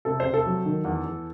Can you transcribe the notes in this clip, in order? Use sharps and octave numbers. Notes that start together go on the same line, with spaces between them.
C3 A4
C5
C3
A4
F#3
D#3
E2
E2